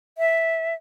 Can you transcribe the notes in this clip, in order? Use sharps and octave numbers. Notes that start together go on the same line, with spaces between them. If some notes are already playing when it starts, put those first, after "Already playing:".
E5